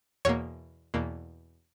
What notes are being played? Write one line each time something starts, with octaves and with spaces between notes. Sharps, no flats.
E2 B2 A#3 C#5
E2 B2 A#3